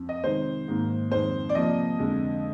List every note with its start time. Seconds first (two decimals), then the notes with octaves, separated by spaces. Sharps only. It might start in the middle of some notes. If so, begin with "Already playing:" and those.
Already playing: F2
0.09 D#5
0.23 C3 D#3 G#3 C5
0.68 G#2 D#3 A#3
1.11 F2 D#3 G#3 C5
1.49 D5
1.55 C3 F3 A#3 D#5
1.99 F2 D3 G#3